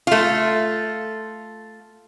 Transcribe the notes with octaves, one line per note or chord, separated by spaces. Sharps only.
A3 F4